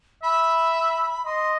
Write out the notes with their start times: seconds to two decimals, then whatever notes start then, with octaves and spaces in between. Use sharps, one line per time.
0.23 E5 B5
1.25 D#5 C6